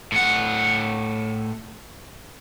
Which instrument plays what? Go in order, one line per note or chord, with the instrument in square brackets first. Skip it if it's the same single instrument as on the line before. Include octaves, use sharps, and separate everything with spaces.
[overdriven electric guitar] A2 F#5